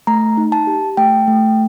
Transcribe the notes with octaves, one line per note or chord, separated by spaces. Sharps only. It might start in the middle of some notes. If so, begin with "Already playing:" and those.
A3 A#5
D#4
A5
G4
A3 G5
A3